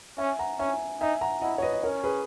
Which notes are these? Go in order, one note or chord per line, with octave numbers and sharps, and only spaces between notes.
C#4 E5 G#5
F#5 A#5
C#4 E5 G#5
D#4 E5 G#5
F#5 A#5
E4 D#5 F#5
C#5
B4 D#5
D#5
C#4 A#4 C#5
G#4 B4